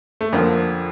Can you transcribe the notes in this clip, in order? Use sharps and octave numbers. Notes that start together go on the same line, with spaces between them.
A3
F2 D3 F3 A#3